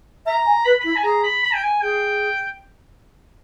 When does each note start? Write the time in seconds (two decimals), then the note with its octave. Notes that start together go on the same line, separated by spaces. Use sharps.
0.26 E5 A#5
0.46 G#5
0.64 B4 B5
0.80 E4 B5
0.96 G#5
1.03 G#4 A#5
1.23 B5
1.43 B5
1.54 G5
1.63 G#5
1.81 G#4 G5